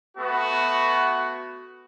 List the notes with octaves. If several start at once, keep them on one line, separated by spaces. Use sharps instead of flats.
A3 B3 F#4